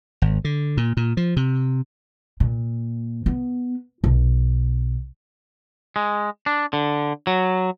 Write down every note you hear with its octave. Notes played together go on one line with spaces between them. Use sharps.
G#1
D3
A#2
A#2
F3
C3
A#2
B3
B1
G#3
D4
D3
F#3